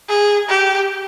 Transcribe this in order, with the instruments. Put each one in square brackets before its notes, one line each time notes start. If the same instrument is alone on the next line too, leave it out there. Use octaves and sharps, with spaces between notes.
[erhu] G#4
G4